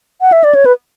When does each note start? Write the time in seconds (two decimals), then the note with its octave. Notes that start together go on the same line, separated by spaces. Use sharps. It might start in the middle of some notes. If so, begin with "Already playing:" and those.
0.21 F#5
0.32 E5
0.44 D5
0.55 C#5
0.66 B4